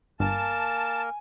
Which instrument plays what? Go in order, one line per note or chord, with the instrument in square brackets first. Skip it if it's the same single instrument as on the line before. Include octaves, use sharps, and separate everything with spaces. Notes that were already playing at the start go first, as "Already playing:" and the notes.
[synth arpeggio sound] G1 [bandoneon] A#3 A#4 [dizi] G#5 [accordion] A5